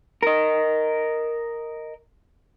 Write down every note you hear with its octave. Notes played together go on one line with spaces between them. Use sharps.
A#4 D#5